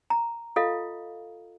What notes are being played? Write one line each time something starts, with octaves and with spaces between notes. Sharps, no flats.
A#5
F4 A4 D#5 F5